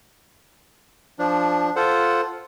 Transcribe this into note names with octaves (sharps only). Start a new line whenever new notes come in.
F3 D4
F4 A4 C5 F#5